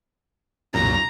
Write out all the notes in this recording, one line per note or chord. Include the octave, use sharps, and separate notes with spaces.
C2 F#2 A#2 A#5